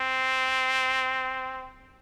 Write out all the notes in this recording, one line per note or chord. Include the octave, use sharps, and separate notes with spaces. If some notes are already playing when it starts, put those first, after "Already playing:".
Already playing: C4